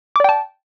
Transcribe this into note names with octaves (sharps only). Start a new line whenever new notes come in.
D5 G5 A5 D6